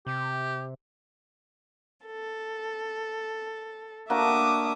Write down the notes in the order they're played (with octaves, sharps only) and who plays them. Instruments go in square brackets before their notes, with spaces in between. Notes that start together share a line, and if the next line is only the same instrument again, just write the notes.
[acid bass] C3 [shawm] G4
[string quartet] A4
[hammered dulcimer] A#3 D4 F#4 [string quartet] E5 D6 D#6